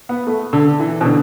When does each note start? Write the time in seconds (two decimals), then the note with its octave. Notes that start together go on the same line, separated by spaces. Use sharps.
0.09 B3
0.27 A3
0.53 D3
0.80 E3
1.01 B2
1.05 D3